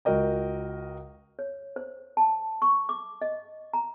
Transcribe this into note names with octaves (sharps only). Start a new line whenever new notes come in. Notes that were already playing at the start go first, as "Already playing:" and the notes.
C#2 F#4 A#4 D#5 G5
C#5
C5
A5
C#6
D6
D#5
A#5